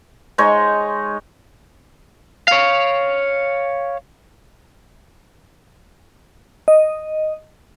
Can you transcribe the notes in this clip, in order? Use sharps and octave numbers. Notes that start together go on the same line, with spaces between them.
G#3 D#4 C#5
C#5 F5
D#5